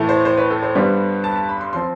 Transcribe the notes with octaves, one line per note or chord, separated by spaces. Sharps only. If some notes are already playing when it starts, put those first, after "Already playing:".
Already playing: A2 E3 A3
C5
C5
B4
A4
C5
G2 D3 G3 B3
A5
A5
B5
C6
F3 C4 C6